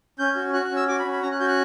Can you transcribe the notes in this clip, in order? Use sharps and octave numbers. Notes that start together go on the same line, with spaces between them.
C#4 G6
F#4
F#4 F#6
F#6
C#4
E6
F#4 D6
B5
C#4
B5
C#4 A#5
F#6
F#4 G6
F#6